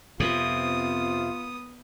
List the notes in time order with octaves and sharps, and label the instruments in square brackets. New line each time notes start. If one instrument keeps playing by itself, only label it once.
[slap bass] F2 C3 [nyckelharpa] B3 D#6 [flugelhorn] F4